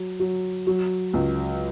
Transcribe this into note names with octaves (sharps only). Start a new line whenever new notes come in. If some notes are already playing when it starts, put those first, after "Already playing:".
Already playing: F#3
F#3
F#3
C#2